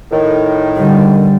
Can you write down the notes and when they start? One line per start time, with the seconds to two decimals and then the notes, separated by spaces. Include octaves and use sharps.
0.11 A2 D#3
0.78 D3 G3